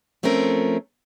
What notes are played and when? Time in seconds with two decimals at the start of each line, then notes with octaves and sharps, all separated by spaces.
0.23 F3 A3 C4 C#4 A#4